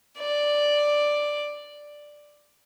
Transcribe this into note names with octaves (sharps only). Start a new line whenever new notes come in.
D5